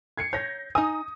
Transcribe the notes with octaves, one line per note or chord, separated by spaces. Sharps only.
G#6 C7 C#7
C#5 G6 A#6
D#4 G#5 D#6